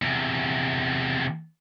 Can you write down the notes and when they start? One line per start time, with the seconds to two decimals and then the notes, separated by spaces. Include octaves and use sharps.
0.02 E2 C3